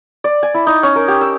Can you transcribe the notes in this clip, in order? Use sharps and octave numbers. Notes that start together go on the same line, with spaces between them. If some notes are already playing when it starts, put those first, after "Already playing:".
D5
G#5
E4
D#4
C#4
A#4
G4
E6